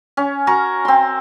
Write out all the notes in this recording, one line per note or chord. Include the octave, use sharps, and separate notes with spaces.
C#4
F#4 A#4 A#5 C#6
C4 C6